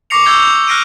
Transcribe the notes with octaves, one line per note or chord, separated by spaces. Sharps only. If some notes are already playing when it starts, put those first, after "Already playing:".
C#6 D6 A#6 C7 C#7 F7
C#6 E6 G6 G#6 C#7 G7
G6 C#7 F7
F6 F#6 A#6 C7 D7 D#7